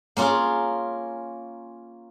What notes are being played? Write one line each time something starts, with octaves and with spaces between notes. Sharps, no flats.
A#3 C#4 F4 G#4